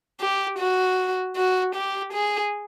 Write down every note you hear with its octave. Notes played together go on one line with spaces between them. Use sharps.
G4
F#4
F#4
G4
G#4